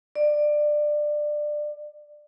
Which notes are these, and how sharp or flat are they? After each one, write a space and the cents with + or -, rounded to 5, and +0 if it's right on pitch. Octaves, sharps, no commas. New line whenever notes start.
D5 +20